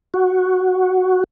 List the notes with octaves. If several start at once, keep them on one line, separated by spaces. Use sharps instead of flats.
F#4